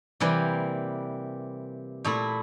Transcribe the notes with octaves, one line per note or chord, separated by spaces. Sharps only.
C3 E3 G3 A#3
A#2 A3 E4